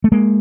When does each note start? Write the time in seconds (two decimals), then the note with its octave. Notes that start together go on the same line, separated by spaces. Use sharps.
0.04 A3
0.12 G#3 A#3